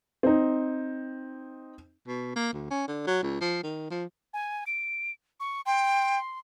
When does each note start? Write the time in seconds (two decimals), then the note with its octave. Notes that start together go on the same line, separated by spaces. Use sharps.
0.23 C4 D#4
2.07 B2
2.36 A#3
2.53 D2
2.70 C#4
2.88 D3
3.07 F#3
3.23 C#2
3.41 F3
3.63 D#3
3.91 F3
4.34 G#5
4.67 D7
5.40 C#6
5.66 G5 C6